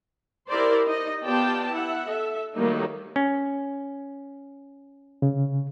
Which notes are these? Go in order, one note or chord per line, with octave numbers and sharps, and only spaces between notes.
E4 G4 A#4 C5 D5
D#4 D#5
B3 F4 G4 D5 G5 A5
E4 E5 F#5
A4 E5
D#3 F#3 G3 A3 A#3 D#4
C#4
C#3